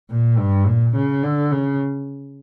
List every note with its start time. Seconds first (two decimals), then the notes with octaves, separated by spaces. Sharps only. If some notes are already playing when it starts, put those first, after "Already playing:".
0.10 A#2
0.39 G2
0.67 A#2
0.95 C#3
1.23 D3
1.51 C#3